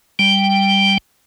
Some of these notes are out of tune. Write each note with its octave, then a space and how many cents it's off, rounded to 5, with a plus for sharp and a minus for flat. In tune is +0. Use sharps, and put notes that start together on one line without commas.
G3 +0 G5 +0